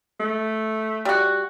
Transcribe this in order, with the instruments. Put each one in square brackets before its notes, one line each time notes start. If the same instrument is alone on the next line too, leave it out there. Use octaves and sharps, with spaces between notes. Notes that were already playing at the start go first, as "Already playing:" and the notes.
[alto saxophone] A3
[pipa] G3 F#4